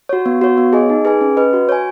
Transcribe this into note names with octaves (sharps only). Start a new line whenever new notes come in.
F#4 C#5
B3
F#4 C#5
B3
G#4 D#5 G#5
D#4
G#4 B4 G#5
C#4
B4 D#5
F#4
C#5 G#5